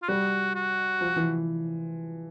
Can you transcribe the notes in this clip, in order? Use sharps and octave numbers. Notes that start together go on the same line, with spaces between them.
F4
G3 F#4
F#4
F3
E3